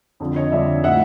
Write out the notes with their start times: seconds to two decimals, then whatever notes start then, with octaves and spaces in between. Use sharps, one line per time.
0.20 F2 D3 F3
0.36 C#5 D#5
0.52 F2 D3 F3 D5 E5
0.84 A2 F3 E5 F#5